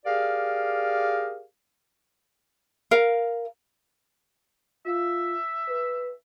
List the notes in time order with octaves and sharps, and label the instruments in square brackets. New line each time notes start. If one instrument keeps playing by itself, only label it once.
[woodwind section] G4 G#4 A#4 D5 F5
[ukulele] A#4 F5
[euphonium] F4 [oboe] E5
[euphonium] B4